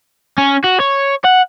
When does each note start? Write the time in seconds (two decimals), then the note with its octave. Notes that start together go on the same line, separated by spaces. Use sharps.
0.38 C#4
0.64 F#4
0.80 C#5
1.25 F#5